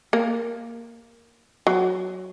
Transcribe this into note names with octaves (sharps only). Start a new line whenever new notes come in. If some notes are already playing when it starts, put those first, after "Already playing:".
A#3
F#3